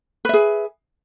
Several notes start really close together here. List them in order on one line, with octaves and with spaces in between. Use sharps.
B4 E5 G#4